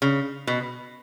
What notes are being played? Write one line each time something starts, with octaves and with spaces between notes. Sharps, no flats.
C#3
B2